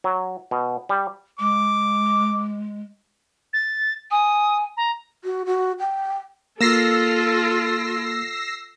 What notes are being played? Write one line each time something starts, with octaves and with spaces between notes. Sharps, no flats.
F#3
B2
G3
G#3 D6
A6
G#5 D#6
A#5
F#4
F#4
G5
A#3 F4 A4 E6 A#6 C7